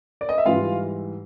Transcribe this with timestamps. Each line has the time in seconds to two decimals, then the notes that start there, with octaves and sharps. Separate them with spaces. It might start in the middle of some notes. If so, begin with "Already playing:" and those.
0.21 D5
0.29 D#5
0.38 E5
0.46 G#2 E3 G3 F4 F5